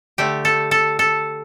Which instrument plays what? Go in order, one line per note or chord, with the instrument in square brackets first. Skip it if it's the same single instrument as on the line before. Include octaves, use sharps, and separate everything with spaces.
[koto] D3 A3 G4
A4
A4
A4